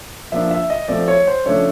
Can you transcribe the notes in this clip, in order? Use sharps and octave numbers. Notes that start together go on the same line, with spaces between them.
F3 A#3 D4 E5
E5
D#5
F3 A3 C4 D5
C#5
C5
C#3 F3 A3 D4 C#5